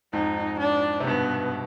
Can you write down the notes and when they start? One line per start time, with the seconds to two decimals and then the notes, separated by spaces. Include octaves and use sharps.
0.13 F2 G#2 D#4
0.60 D4
1.00 C3
1.07 G2 B2 B3